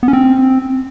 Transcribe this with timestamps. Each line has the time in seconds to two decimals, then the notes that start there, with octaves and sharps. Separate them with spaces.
0.03 B3
0.08 C#4
0.13 C4